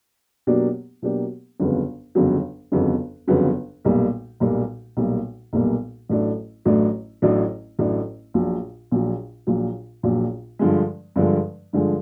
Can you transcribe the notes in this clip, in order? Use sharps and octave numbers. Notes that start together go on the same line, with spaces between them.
B2 F#3 A#3 D4 G4
B2 F#3 A#3 D4 G4
G1 F2 C#3 F#3 B3
G1 F2 C#3 F#3 B3
G1 F2 C#3 F#3 B3
G1 F2 C#3 F#3 B3
B1 A#2 G3 A#3
B1 A#2 G3 A#3
B1 A#2 G3 A#3
B1 A#2 G3 A#3
A1 A2 F#3 A3 D4
A1 A2 F#3 A3 D4
A1 A2 F#3 A3 D4
A1 A2 F#3 A3 D4
A#1 A#2 F#3
A#1 A#2 F#3
A#1 A#2 F#3
A#1 A#2 F#3
G2 D3 F3 G#3
G2 D3 F3 G#3
G2 D3 F3 G#3